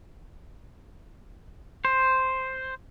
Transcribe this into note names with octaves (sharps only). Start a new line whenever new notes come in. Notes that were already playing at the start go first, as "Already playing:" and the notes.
C5